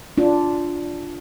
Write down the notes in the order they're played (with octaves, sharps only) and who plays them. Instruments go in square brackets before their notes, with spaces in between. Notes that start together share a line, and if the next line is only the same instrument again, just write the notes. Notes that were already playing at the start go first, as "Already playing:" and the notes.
[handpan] D4 F4